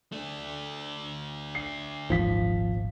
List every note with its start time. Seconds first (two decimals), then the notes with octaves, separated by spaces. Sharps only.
0.12 A3 D4
1.55 C7
2.10 D#1 G#1 F3 B6